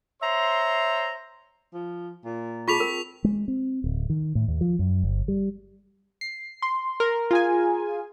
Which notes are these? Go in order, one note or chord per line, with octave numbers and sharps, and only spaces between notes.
C5 C#5 E5 A#5 C6
F3
A#2
F4 G#4 A5 C#6 B6 F7
C4 A#4
G#3
C4
D1
D#3
A2
D#2
F3
F#2
G1
G3
C7
C6
A#4
F4 G#4 G#5